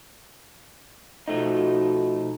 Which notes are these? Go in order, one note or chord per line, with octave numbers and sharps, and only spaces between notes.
B2 F3 A3 D#4